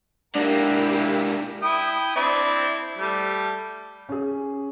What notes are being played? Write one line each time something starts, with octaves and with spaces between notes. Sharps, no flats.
G#2 A#3 D4 E4 G4 A#4
E4 G5 D#6
C4 D4 E4
G3 A3
C#4 G#4